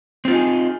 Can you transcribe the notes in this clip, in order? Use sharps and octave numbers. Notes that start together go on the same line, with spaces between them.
C4 D#4 F4 G#4